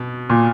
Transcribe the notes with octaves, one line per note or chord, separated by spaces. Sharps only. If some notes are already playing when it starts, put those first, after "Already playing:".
Already playing: B2
A#2